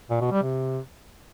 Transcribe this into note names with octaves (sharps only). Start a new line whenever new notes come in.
A#2
B2
G3
C3